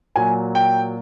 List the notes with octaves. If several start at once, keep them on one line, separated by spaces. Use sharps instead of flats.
A#2 F#3 G#5
G5